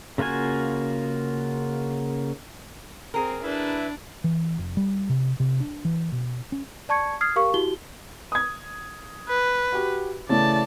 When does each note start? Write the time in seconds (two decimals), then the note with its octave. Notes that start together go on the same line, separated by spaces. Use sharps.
0.18 C#3 A#3 F4 F#4 G#5
3.14 C4 G#4 A#4
3.43 D4 E4 B4 E5
4.24 E3
4.58 F1
4.77 G3
5.10 C3
5.40 C3
5.60 D4
5.85 E3
6.12 B2
6.52 C#4
6.89 D5 A5 C#6 G#6 C#7
7.21 D#6 F6 G#6 C7
7.36 G4 A#4 F5 C#6
7.54 E4 F#4 G4 G7
8.32 D#6 G#6
9.29 B4
9.72 F#4 G4
10.29 C#3 E3 A3 D5 A5